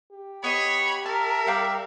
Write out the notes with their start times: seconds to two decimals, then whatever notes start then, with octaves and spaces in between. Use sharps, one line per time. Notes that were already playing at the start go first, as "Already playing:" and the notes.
0.12 G4
0.44 B3 C#5 D#5 B5
1.06 A#4 E5 A5
1.47 G3 D5 F5 G5